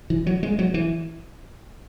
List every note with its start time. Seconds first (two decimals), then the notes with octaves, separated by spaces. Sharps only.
0.10 E3
0.26 F#3
0.43 G#3
0.59 F#3
0.74 E3